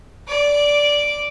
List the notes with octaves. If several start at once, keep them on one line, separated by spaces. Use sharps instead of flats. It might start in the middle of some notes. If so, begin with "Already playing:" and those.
D5 D6